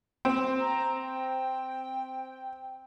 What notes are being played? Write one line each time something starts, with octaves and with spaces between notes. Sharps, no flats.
C4
A#5
G5